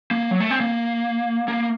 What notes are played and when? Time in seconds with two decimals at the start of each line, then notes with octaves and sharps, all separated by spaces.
0.11 A#3
0.31 F#3
0.40 A3
0.51 C4
0.60 A#3
1.48 A#3